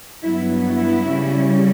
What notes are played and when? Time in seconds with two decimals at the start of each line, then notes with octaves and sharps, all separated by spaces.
0.23 G2 F#3 B3 E4
0.66 E4
1.09 C#3 G3 C#4